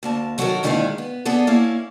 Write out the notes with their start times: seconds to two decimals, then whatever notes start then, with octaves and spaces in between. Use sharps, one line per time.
0.03 D2 A#3 A5
0.38 D#3 F#3 F#4 G4 A4 A#4
0.63 D2 A#2 D#3 G#3 E4 F5
0.98 B3
1.25 B3 D4 G#4 A4
1.47 A#3 C#4 E4 F5